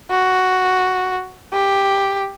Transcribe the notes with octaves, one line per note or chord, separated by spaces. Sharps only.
F#4
G4